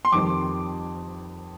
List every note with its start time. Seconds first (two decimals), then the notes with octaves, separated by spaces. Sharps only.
0.05 C6
0.12 F2 D#3 G3 C4 D6